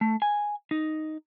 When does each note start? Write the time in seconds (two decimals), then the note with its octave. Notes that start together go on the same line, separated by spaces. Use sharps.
0.01 A3
0.22 G#5
0.71 D#4